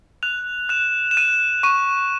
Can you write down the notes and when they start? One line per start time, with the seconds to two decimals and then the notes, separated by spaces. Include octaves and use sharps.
0.23 F#6 F7
0.69 F#6 E7
1.11 E7
1.17 F#6 D#7
1.63 C#6 D#7